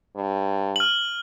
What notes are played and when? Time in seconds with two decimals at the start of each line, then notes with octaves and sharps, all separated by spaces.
0.15 G2
0.76 F6 F#7